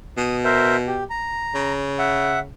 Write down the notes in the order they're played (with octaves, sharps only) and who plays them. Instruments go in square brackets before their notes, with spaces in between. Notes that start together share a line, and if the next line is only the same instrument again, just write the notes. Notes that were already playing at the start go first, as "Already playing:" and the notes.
[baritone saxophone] B2 [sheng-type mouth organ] D#6
[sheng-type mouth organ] A#4 C5 E5
G4
A#5
[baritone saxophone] C#3
[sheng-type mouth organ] E5 F#5